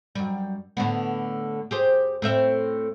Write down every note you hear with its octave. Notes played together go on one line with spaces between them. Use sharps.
F#2 G3
A2 D3 B3
G4 G#4 C5
A2 C4 E5